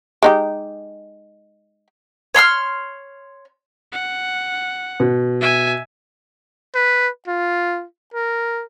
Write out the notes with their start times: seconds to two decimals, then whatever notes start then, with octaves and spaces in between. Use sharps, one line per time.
0.23 G#3 D#4 G4
2.34 C#5 C6 E6 F6
3.92 F#5
5.00 B2
5.41 E5 G#5
6.75 B4
7.28 F4
8.14 A#4